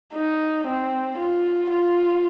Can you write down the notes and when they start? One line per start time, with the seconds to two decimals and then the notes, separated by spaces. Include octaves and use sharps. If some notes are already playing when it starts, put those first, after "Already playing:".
0.14 D#4
0.67 C4
1.18 F4
1.71 F4